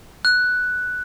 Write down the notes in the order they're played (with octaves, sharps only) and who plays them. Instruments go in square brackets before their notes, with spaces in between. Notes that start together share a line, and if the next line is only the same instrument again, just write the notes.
[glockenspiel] F#6